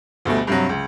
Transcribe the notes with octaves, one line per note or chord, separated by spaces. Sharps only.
D2 B2 G3 A3
G2 C3 F#3
C#2